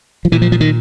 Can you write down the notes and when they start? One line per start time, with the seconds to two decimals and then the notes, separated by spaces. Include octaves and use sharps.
0.25 F3
0.32 A#2 E3
0.42 F3
0.52 F3
0.61 D#3